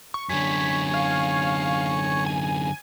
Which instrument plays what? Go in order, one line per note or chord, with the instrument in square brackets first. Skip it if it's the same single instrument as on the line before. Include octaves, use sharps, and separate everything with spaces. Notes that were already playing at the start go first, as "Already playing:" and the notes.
[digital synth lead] C#6
[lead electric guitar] F#2 D3 [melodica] C#5 G#5 C#6 [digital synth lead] B6
[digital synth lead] F5
G#5